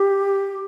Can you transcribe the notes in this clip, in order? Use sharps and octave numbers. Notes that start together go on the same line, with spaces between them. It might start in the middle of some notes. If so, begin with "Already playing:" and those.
Already playing: G4